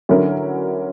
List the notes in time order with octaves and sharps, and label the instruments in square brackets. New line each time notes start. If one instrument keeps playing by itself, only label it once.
[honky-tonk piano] D3 F#3 C#4 E4 A#4